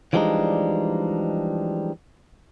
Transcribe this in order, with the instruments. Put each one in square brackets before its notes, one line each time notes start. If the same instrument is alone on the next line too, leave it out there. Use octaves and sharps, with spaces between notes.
[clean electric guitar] E3 F3 G3 G#3 D4 D#4